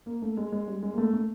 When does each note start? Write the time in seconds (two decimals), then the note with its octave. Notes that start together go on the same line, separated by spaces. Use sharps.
0.06 A#3
0.22 A3
0.37 G#3
0.52 G#3
0.67 G3
0.82 G#3
0.93 A#3
0.98 A3
1.13 A3